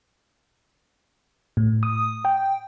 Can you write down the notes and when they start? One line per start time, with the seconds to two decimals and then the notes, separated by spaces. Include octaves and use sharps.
1.57 A2
1.83 D#6
2.25 G5